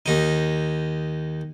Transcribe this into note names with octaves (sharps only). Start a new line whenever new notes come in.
D#2 D#4